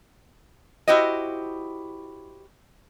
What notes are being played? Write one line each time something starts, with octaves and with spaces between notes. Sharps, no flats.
E4 F#4 G4 C5 D#5